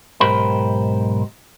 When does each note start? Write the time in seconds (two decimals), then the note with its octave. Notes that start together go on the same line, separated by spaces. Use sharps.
0.20 B1 G#2 G4 A#4 C5 B5